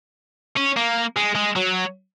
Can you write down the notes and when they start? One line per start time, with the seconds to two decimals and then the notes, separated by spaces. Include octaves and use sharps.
0.57 C#4
0.77 A#3
1.16 G#3
1.35 G#3
1.56 F#3